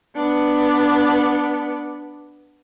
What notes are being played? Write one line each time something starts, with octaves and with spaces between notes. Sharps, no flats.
B3 D4